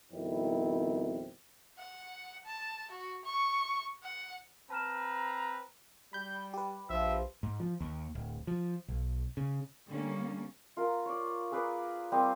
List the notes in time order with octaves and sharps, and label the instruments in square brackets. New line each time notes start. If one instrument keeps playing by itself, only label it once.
[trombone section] F2 B2 D#3 G3 C4 E4
[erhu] F#5
A5
F#4
C#6
F#5
[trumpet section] C4 B4 A#5 [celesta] A5 F6 E7
[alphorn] G3 [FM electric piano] B5 G6
[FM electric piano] G4 B4
[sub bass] A#1 [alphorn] F3 [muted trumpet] E5
[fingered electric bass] G#2
F3
D#2
D1
F3
B1
C#3
[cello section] D3 G3 A#3 C#4
[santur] F4 A#4
C#5 D5
G#4 A#4 B4 D5
G3 A#3 C4 D#6